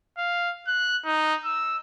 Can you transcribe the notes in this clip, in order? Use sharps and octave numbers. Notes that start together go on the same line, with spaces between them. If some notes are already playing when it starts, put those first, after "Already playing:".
F5
F#6
D#4
E6